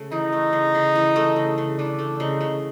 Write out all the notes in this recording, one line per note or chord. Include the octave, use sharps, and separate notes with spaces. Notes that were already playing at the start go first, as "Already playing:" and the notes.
Already playing: C#3 A3
E3 D#4
A3
C#3
C#3
E3
A3
C#3
C#3
E3 D4
A3
C#3 D#4
C#3